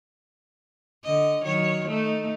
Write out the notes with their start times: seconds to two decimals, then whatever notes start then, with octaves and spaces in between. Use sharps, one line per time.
1.04 D3 D#5
1.42 D#3 F#3 C#5
1.87 A3 D#4